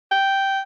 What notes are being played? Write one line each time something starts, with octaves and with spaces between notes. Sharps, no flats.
G5